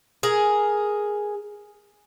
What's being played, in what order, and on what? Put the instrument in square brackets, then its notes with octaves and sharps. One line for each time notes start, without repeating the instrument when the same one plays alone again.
[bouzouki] G#4 A#4